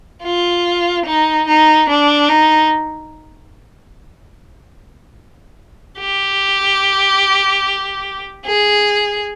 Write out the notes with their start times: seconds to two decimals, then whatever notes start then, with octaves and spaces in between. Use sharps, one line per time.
0.23 F4
1.05 D#4
1.47 D#4
1.88 D4
2.29 D#4
5.99 G4
8.46 G#4